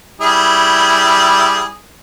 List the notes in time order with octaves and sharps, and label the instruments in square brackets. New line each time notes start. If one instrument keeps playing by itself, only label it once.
[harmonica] G3 E4 G#4